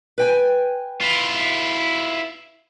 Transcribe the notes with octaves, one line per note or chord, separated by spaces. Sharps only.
B4 G5 G#5
E4 F4